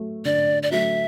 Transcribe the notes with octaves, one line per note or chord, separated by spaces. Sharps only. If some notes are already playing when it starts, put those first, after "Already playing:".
Already playing: F#3 A3
D3 D5
D5
F#3 A3 E5